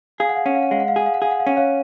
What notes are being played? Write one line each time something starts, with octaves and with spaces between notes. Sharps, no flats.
G#4 F5
F#5
F5
C#4 F#5
F5
F#5
G#3 F5
F#5
F5
G#4 F#5
F5
F#5
G#4 F5
F#5
F5
C#4 F#5
C#5 F5